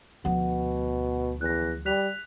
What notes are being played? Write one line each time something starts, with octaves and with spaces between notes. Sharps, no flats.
D2 B2 F3 F#5
E2 F#6 A#6
G3 F#6 B6 F7